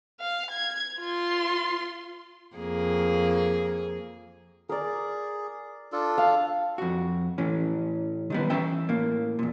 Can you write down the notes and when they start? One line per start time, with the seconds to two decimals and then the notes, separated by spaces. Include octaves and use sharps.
0.20 F5
0.51 G#6
1.01 F4 C6
2.56 F2 A#3 G#4
4.69 G#4 A#4 D5
5.92 D4 F4 A4
6.18 F5
6.78 F2 F#4
7.38 A2 E3 C#4
8.30 D#3 G3 B3
8.50 E3 C#4 E5 G5
8.89 A2 A#3
9.39 E2 A#2